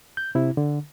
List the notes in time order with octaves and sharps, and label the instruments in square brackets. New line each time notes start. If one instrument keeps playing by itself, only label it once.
[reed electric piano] G6
C3 E4
D3